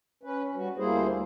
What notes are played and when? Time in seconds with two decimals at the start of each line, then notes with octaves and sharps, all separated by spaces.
0.23 C#4 B4
0.55 G3 F#4
0.77 D2 G3 A#3 E4 G#4 C5